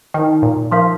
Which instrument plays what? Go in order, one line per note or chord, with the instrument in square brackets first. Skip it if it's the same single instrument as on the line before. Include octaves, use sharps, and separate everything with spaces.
[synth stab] D#3 [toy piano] D#4 A#4 G5
[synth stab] A#2
[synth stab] F3 [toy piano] A#4 F5 C6